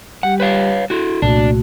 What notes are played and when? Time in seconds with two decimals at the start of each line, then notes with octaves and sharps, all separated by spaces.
0.23 G3 G4 F#5
0.40 B4 C#5 F5
0.90 E4 F#4 A4
1.22 C2 A#2 A3 D4 F#4